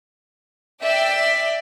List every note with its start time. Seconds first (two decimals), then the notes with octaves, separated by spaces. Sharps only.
0.82 D5 E5 G5